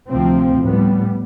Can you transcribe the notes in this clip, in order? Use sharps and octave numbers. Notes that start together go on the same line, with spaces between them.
D2 C3 F3 C4
A2 G3 B3